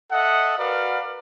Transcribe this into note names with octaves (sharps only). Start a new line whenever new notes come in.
A4 D#5 E5 F#5
F#4 A#4 B4 D5 F5